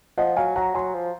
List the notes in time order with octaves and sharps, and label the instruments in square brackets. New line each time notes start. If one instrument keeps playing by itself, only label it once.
[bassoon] F3 [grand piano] D#5 F#5
[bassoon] F#3 [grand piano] F5 G#5
[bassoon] F#3 [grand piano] F#5 A#5
[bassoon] F#3 [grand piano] G#5 C6
[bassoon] F3